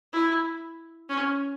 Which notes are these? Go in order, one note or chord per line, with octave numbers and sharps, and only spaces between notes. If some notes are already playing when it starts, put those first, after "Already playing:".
E4
C#4